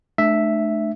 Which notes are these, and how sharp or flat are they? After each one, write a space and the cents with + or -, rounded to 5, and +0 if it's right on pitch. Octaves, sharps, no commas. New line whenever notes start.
A3 -25 D4 +35 E5 +0